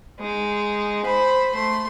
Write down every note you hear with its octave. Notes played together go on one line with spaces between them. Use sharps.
G#3 D#4
C5 B5
A3 C6